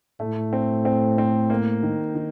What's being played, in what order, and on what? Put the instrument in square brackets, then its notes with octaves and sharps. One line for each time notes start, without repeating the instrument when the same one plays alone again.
[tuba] A2 [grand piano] A3
[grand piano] C4
C4
C4
A#3
D#3
D#3